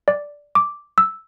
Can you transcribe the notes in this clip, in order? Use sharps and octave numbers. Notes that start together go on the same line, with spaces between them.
D5
D6
E6